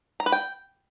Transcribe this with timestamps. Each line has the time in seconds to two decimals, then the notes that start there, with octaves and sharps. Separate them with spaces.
0.20 A#5
0.26 B4
0.32 G5